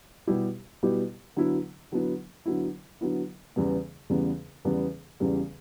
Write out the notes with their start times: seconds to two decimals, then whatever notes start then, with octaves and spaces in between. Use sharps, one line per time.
0.27 B2 G3 B3 E4 G4
0.83 B2 G3 B3 E4 G4
1.36 D3 F#3 B3 E4
1.92 D3 F#3 B3 E4
2.46 D3 F#3 B3 E4
3.01 D3 F#3 B3 E4
3.56 E2 C#3 E3 G3 B3
4.10 E2 C#3 E3 G3 B3
4.65 E2 C#3 E3 G3 B3
5.20 E2 C#3 E3 G3 B3